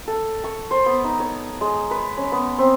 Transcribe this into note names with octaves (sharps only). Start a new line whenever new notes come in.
A4
C#6
C5
B3
D#4
C#5
G#3
B4
C#4
B3
C4